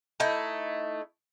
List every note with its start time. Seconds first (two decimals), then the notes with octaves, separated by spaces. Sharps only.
0.20 A3 D#4 E4